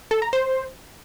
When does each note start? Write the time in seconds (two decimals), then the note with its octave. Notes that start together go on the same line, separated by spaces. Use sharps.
0.11 A4
0.22 A#5
0.33 C5